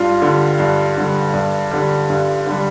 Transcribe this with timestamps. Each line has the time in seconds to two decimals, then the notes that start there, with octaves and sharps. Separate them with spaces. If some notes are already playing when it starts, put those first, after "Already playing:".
Already playing: G2 F4
0.22 D3 G3
0.59 G2
0.97 D3 G3
1.34 G2
1.71 D3 G3
2.10 G2
2.46 D3 G3